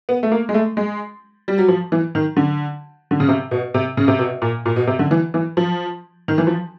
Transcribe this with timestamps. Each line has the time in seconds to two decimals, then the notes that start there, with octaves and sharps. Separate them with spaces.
0.09 B3
0.23 A3
0.32 A#3
0.49 G#3
0.54 A3
0.77 G#3
1.48 G3
1.58 F#3
1.68 F3
1.92 E3
2.15 D#3
2.37 D3
3.11 D3
3.20 C#3
3.28 C3
3.51 B2
3.74 C3
3.97 C#3
4.08 C3
4.19 B2
4.42 A#2
4.66 A#2
4.76 B2
4.87 C3
4.99 D3
5.11 E3
5.34 E3
5.57 F3
6.28 D#3
6.38 E3
6.47 F3